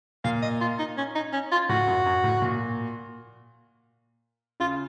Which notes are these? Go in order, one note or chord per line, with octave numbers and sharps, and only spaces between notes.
A#2 F5
D#5
F4
D#4
C#4
D#4
C#4
F4
A2 F#4
F#2
F#2
A2
A#2
C#3 F4